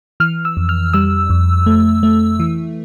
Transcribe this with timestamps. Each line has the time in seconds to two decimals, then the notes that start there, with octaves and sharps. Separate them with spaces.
0.20 E3 F6
0.45 E6
0.57 F2
0.69 F6
0.94 G3 E6
1.30 F2
1.66 A3
2.03 A3
2.40 E3